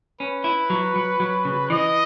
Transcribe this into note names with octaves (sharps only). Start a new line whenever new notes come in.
C#4 B4
E4
F#3
F#3
F#3
C#3
E3 D#5